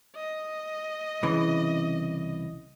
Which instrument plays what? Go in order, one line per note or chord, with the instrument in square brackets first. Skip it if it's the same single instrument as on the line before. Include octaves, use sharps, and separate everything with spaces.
[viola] D#5
[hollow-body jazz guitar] C2 C#3 E3